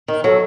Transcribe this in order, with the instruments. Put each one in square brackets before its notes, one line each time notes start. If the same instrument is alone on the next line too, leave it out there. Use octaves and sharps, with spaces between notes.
[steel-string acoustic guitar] D#3
[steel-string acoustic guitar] F#3 [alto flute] A4